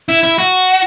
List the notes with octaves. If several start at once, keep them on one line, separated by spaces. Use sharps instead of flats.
E4
E4
F#4